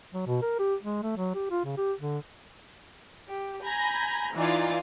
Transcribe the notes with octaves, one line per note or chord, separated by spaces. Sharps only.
F#3
B2
A#4
G4
G#3
A3
F#3
G4
F4
C#3
G4
D3
G4
G#5 A#5 B5 G6 G#6 A#6
E3 D#4 F4 D5 G#5 A6